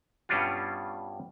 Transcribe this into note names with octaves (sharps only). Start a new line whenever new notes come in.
G2 B2 G3 C#4 D4 F4